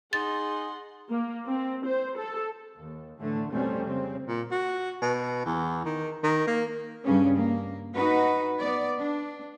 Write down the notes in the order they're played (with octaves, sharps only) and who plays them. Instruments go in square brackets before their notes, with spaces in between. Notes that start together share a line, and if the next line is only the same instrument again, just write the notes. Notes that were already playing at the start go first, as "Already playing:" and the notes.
[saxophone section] D#4 [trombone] G#4 [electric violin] F#5 C6 [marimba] A6
[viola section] A#3
C4
C5
A4
[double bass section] D#2
A2 D3 E3 A3
F2 B2 G3 A3 C4 C#4
C#3 C4
[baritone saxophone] A#2
F#4
B2
E2
D#3
D#3
A#3
[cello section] G2 C#3 C#4
A#3
D#4 F#4 B4
B3 D5
D4